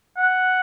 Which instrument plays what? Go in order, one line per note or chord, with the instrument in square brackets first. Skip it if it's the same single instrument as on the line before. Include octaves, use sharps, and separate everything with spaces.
[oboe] F#5